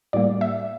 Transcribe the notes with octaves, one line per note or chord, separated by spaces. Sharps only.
A2 G3 A#3 D5
E5